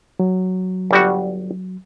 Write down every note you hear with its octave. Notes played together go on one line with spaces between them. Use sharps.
F#3
G1 G3 F#4